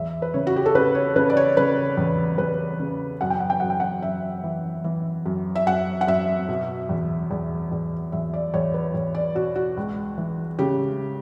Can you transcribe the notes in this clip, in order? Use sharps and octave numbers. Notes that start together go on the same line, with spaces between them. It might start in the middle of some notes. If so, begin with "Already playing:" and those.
Already playing: E2 E5
B4
C#3 C#5
F#4
G4
A4
C#3 B4
C#5
C#3 B4
D5
C#5
C#3 B4
E2
E2 B4
C#3
F#2 F#5
G5
F#5
G5
F#2 F#5
G5
F#5
F#2 E5
E3
E3
F#2
E5
F#2 F#5
F#5
F#2 E5
B2
E2
E2
E2
E2 E5
D5
E2 C#5
B4
E2 C#5
D5
B2 F#4
F#4
C#2
E3
C#3 G4